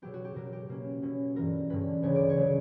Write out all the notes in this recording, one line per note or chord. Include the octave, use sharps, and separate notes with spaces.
B2 F#3 B3 G4
F#4
G4
B2 F#3 B3 A#4
G4
B2 A#3 C#4
B2 F#3 C#4
G2 E3 B3 A#4
G2 D3 G3 C#4 B4
D2 C#3 E3 B3 C#5
D5
C#5
C#3 F#3 B3